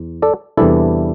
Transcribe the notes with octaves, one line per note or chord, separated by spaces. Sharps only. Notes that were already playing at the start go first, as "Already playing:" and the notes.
Already playing: E2
A4 D5
E2 C3 E3 G3 D4 E4 A4